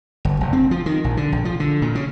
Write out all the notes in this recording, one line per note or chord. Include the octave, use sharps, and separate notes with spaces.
G1
F1
C4
F3
D#3
A#1
D3
A#1
F3
D3
A#2
C#3